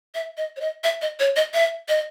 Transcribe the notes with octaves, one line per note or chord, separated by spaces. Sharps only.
E5
D#5
C#5
D#5
E5
D#5
C#5
D#5
E5
D#5